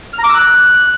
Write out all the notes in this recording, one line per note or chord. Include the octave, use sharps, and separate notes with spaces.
F6
A#5
D6
E6
F#6